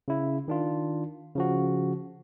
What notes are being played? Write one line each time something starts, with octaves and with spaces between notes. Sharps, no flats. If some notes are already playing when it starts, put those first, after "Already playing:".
C#3 E4
D#3 D4 F4
C#3 F3 F#4